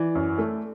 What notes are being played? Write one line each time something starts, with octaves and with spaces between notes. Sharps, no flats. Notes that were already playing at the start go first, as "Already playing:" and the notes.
Already playing: E3 D5
F#2
A3